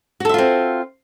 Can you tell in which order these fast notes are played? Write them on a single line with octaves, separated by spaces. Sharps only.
F#4 A4 E5 F4 C4